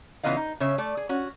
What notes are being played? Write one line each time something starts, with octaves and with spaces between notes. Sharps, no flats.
C#3 E3 B3 F4 D#5 F5
D#4
C#3 G#4 C#5 E5
A3 D5
G#4
C#4 F#4